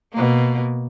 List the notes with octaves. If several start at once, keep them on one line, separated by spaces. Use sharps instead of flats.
B2 A#3